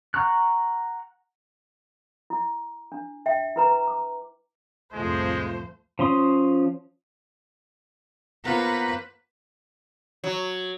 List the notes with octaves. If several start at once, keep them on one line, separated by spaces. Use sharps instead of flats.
F#5 A#5 C#6 F6 F#6
E4
D4
E5 G5
E4 B4 A#5
D6
C2 F2 A2 F3 G#3 A3 C5
F3 C#4 C6 D#6
A#3 B3 F4 B4 C5 F5 F#5 A#5
F#3